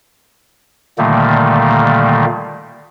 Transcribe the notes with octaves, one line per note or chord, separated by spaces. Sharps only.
A#2 D3 D#3 G3 A3 A#3